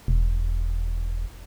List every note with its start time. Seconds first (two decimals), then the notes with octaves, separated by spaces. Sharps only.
0.08 E1